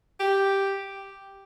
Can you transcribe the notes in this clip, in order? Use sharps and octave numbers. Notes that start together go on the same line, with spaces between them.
G4